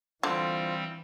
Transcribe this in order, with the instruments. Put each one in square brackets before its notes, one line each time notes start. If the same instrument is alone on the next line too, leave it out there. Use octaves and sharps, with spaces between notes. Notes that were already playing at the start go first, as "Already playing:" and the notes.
[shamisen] D3 [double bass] E3 [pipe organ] G3 C4 [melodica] F4 C5